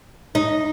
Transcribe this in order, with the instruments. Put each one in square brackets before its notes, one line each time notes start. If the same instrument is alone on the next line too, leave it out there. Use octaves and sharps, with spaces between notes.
[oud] D#4